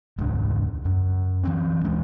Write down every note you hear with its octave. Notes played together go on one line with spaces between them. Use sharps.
E1 C#2 G#2 D4
F#2
E3 C4 C#4
D#2 E3 G#3 D4